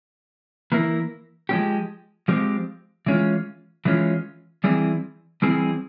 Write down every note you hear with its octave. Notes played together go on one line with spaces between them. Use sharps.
E3 A#3 E4 A#4
F3 G#3 C4 G4
F3 G#3 C4 G4
E3 G#3 C#4 F4
E3 G#3 C#4 F4
E3 G3 C4 E4 G#4
E3 G3 C4 E4 G#4